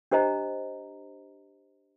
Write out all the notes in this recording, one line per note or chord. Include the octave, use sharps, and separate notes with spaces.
D4 G4 C5 D#5 A#5